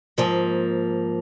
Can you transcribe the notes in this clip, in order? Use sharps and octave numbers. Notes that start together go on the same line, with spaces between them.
G#2 F3 A#3